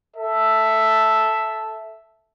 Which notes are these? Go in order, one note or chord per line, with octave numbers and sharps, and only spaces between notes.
A4 E5